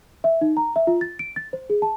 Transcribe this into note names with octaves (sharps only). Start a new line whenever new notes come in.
E5
D#4
A#5
E5
F4
A6
D7
A6
C5
G#4
A5